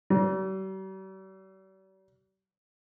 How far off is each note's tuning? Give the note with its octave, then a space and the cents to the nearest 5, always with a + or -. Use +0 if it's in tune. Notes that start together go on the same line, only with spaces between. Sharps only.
G3 -45